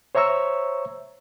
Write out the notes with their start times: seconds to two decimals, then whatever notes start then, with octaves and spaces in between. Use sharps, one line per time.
0.15 C5 C#5 E5 A#5 C#6 E6